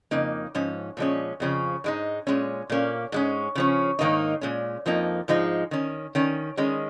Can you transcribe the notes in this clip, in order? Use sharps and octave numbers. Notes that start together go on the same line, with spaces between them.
F2 C#3 A#3 D#4
G#2 F3 C#4
A#2 F3 G#3 C#4
F2 C#3 F3 C#4
G#2 G#3 D#4
A#2 G#3 C#4
A#2 A#3 C#4
G#2 G#3 C#4
C#3 F3 C#4
G#2 D#3 A#3 D#4
A#2 G#3 C#4
F2 F3 A#3 D#4
G#2 F3 G#3 D#4
D#3 C#4
D#3 C#4
D#3 G#3 C#4